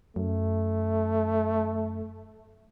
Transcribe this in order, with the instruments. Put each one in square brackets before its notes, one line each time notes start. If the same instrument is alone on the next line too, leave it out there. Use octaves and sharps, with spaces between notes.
[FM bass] F#2 [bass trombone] A3